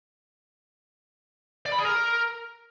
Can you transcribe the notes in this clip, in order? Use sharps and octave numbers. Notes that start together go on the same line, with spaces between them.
D5
B5
G#4
A#4